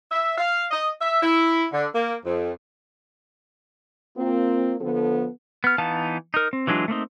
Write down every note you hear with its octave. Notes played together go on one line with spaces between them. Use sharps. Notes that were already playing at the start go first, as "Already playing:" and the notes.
E5
F5
D#5
E5
E4
D3
A#3
F2
A#3 C4 F4
D3 F3 B3 A4
B3 F6
E3 B3 D#4 F5 A5
D#4 A#4
C4
E3 F#3 G#3 D4 F4
A3 A#3 C4 D#4